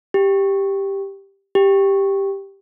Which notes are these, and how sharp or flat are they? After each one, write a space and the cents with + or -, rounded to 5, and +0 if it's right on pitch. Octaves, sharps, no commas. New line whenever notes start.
G4 +5
G4 +5